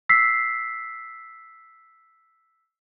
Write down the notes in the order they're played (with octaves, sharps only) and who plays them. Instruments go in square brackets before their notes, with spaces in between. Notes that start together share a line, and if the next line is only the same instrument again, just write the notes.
[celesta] E6 B6 C7